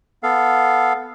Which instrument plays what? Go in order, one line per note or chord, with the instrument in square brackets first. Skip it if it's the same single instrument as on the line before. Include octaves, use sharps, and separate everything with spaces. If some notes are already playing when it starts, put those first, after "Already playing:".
[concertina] B3 A4 F5